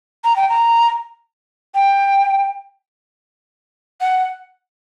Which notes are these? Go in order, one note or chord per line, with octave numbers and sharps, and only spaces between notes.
A#5
G5
A#5
G5
F#5